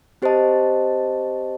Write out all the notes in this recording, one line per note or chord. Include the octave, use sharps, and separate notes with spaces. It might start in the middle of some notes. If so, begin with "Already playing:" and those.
C4 G4 C5 D#5 A5